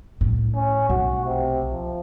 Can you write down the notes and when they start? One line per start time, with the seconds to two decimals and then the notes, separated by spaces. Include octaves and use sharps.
0.21 A2
0.55 C#4
0.89 B1 A3 F#4
1.25 C3
1.72 F3